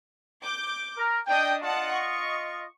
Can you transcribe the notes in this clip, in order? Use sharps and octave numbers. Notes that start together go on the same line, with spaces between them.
D6 G6
A#4
D4 D#5 G5 D#6
F4 D#5 F#5 A5
C#6